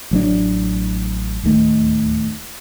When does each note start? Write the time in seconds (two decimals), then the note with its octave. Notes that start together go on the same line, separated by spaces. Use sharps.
0.11 A1 F#3 A#3 D4
1.43 D1 D#2 D#3 A3